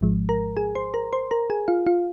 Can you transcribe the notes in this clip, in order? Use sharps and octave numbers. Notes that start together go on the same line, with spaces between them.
G#1 G#2 F3 G#3
A#4 A#5
G#4 G#5
C5 C6
A#4 A#5
C5 C6
A#4 A#5
G#4 G#5
F4 F5
F4 F5